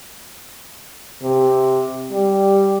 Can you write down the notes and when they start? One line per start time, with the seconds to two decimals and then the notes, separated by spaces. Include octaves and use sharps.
1.23 C3
2.11 G3